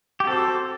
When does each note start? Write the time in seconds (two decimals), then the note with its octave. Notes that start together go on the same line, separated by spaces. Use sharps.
0.20 G4
0.27 C4 F#4 A4 C5